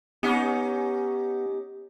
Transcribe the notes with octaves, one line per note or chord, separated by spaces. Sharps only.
B3 C#4 D#4 G4